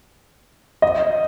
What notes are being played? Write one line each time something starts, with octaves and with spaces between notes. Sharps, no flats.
D#5